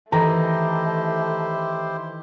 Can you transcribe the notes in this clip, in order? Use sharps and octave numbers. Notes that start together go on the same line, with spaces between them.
D#3 E3 A3 E4 G4 A4 C5 A#5